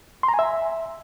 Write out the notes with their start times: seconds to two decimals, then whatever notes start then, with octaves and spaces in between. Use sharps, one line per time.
0.23 C6
0.28 A#5
0.34 G#5
0.39 E5